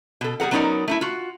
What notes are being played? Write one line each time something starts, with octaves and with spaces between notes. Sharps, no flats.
B2 A4
G3 G#4 A#4 F#5
F#3 B3 C#4 D#4 A#4 D5
A3 D#4 E4
F4 F#4